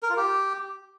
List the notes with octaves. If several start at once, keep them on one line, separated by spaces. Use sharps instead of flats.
A#4
F4
G4